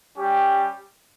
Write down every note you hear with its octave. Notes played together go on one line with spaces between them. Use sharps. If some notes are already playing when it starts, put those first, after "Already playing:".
G3 C#4 G4